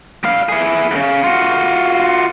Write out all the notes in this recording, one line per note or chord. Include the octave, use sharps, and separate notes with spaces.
G3 F5
E4 G#4
E2 C#3
F4 F#4